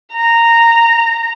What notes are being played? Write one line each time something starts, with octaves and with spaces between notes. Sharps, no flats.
A#5